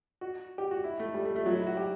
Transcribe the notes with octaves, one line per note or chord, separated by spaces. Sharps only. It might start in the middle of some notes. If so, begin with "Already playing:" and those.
F#4
G4
F#4
E4
A3
G3
A3
A3
F#3
E4
F#4
G4